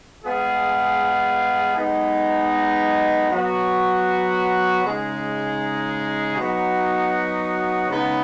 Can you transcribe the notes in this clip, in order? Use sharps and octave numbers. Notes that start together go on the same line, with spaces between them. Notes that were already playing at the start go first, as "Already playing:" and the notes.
G#3 B3 F4 G#4
G#3 B3 D#4
F#3 B3 F#4
C#3 G#3 D#4 G#4
F#3 B3 D#4 F#4
C#3 G#3 B3 D#4